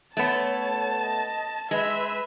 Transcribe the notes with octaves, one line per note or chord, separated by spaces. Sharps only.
A3 B3 C#5 A5
D#5
G#3 B4 E5 B5